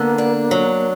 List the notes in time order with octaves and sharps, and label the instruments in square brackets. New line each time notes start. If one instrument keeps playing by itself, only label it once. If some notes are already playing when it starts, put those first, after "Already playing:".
Already playing: [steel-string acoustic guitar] D3 B3 [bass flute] A#3
[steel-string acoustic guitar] D4
F#3